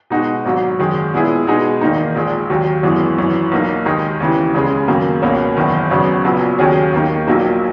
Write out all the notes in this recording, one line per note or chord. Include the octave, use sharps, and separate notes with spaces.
B2 G#3 D#4 F#4
G#1 G#2 F#3
F#2 D#3 G#3
A#2 G#3 B3 E4 G#4
B2 G#3 B3 D#4 G#4
E2 D#3 A#3 D#4
A#1 A#2 G#3
D#2 D#3 F#3
G#1 F#2 E3 G#3 B3
G#1 F#2 E3
B1 B2 A#3 D#4
D#2 D#3 G#3 D#4 G#4
D#2 C#3 E3
C#2 C#3 G#3 C#4 G#4
F#2 D#3 F#3 A#3
C#2 B2 A#3 C#4
F#1 E2 D#3
G#1 F#2 C#3 F#3 B3
A#1 A#2 F#3 B3
D#2 D#3 F#3 C#4 G#4
D#2 D#3 A#3 D#4
A#1 A#2 F#3 A#3 D#4